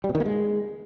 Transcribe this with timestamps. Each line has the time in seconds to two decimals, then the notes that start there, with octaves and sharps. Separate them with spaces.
0.04 G3
0.09 B2
0.15 D#3
0.20 A#3
0.25 G#3